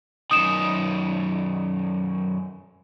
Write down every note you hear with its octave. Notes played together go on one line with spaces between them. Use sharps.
F#2 D#3 D#6 E7